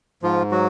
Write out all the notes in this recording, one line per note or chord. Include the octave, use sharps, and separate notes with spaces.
G#2 F3 F4
F#3 F#4